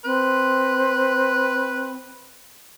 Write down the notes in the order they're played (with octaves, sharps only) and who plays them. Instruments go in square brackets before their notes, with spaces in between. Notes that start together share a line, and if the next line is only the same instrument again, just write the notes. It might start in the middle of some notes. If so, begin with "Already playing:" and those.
[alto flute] C4 [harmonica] B4